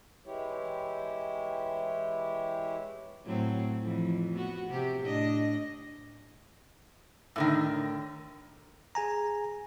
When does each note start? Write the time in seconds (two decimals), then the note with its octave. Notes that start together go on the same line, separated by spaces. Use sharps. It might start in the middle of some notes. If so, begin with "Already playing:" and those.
0.26 E3 G#3 E4 G4 C#5
3.25 A2 F#3 C4
3.82 F2 E3
4.35 B3 F#4
4.70 C3 G4
5.02 A2 D4 D#5
7.36 A2 D3 D#3
8.95 G#4 G#5 A#5